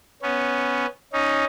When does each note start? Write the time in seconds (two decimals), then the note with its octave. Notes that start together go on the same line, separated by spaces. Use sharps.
0.22 B3 C#4
1.13 C#4 D#4